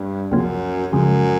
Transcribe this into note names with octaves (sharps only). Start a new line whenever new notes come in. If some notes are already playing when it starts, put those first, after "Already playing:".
Already playing: G2
C#2 F#2 C3 F3 A#3 C#4
C#2 F#2 C#3 F3 G#3